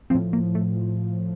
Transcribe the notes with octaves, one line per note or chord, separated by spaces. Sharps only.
A2 F3 C4
A#3
A3